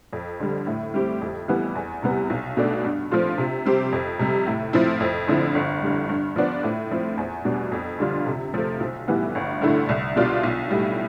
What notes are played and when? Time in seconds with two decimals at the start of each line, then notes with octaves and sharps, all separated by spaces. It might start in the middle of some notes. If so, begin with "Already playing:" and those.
0.13 F2
0.40 D3 G3
0.67 A2
0.94 G3 C4 G4
1.21 F2
1.48 E3 G3 B3
1.75 E2
2.03 C3 G3 B3
2.30 B1
2.57 B2 A3 D4
2.84 G2
3.11 F3 A3 C4 F4
3.38 C3
3.66 G3 C4 G4
3.92 F2
4.19 C3 G3
4.47 A2
4.73 F3 C4 E4
5.00 F2
5.28 D3 F3 C4 E4
5.55 G1
5.83 G2 D3 G3
6.09 G2
6.36 F3 B3 D4
6.63 A2
6.91 F3 C4
7.17 E2
7.45 B2 G3 D4
7.72 F2
7.99 D3 G3 D4 F4
8.26 C3
8.54 F3 A3
8.80 B1
9.08 A2 E3 G3 B3
9.35 G1
9.61 G2 D3 A3 E4
9.89 C2
10.16 B2 G3 D4 F4
10.43 B1
10.71 A2 G3